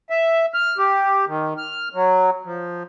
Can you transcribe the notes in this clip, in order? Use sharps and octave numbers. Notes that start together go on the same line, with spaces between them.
E5
F6
G4
D#3
F6
F#3
F3